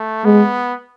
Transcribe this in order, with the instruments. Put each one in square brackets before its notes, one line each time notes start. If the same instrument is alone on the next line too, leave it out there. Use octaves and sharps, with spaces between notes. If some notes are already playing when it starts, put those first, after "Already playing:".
Already playing: [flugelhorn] A3
[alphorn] G#3 [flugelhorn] B3